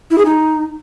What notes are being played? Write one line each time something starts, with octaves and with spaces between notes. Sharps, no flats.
E4
G#4
D#4